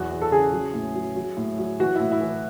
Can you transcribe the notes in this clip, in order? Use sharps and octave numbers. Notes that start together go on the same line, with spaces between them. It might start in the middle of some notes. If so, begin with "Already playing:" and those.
Already playing: E2 F#3 F#4
E2
A4
C#3 G#4
F#3
A2
F#3
F#3
A2
F#3
E3 F#4
A2 E4
E4
E3